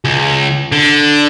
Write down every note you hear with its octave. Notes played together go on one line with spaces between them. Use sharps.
C#2
D3